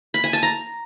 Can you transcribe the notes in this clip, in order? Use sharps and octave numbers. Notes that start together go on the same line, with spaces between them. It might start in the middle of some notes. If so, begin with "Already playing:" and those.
B5
G#5
A5
A#5